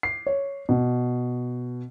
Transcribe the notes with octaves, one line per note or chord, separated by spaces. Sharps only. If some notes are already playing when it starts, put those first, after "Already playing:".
C7
C#5
B2